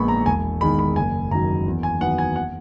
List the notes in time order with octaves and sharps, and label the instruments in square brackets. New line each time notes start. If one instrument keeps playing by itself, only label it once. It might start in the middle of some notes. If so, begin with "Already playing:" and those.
Already playing: [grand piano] A#1 A#2 G#3 B3 B5 C#6
A#5
E1 G#5
E2 D#3 G#3 B5
B5
F#1 G#5
F#2 D#3 F#3 A#5
E2
G#5
D#3 F#3 B3 F#5
G#5
F#5